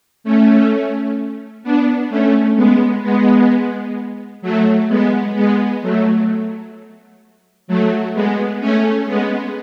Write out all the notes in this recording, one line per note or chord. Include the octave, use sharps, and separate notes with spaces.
A3 C#4
B3 D4
A3 C#4
G#3 B3
G#3 B3
F#3 A3
G#3 B3
G#3 B3
F#3 A3
F#3 A3
G#3 B3
A3 C#4
G#3 B3